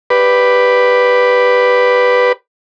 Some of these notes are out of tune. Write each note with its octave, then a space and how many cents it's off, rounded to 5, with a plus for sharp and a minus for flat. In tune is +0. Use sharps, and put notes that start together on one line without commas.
G4 -5 B4 +0 D5 +0